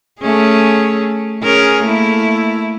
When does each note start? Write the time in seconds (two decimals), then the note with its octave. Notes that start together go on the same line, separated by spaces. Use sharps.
0.21 A3 C#4 G#4
1.43 C#4 G#4 A#4
1.85 A3 A#3 E4